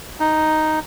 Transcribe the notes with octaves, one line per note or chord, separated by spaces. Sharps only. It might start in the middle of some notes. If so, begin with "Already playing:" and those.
D#4